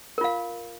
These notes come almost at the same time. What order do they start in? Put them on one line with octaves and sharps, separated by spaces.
A#4 F4 F5